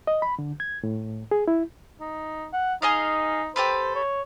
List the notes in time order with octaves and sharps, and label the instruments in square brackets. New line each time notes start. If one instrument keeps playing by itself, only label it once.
[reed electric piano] D#5
B5
D3
G#6
A2
G#4
E4
[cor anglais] D#4
F#5
[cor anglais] D#4 [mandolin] G#4 D#5 F5
[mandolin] G4 A4 B4 [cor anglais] C5
[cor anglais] C#5